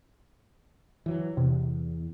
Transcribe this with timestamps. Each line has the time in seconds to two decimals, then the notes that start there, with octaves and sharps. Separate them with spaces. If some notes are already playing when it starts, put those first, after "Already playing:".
1.06 E3 F#3
1.37 E2 C3